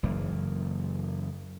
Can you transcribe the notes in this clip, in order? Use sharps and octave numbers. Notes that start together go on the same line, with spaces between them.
F#1 F#2 E3 A#3